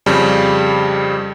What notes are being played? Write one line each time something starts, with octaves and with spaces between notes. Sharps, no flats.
F2 C#3 G3